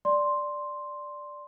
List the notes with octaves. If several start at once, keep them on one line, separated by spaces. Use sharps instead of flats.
D5 C6